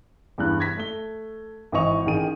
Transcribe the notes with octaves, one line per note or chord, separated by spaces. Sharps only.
E2 G2 F#6
G#6 A#6 B6
A3 G7
G#1 E3 E4 D#5 C#6 F7
A1 D#3 G#4 G5 D#7